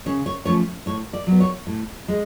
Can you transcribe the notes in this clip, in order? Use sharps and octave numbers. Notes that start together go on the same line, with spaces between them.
C#3 C#5
C#5
F3 A3 C#4 C#5
A2 C#5
D5
F#3 B3
C#5
A2
G#3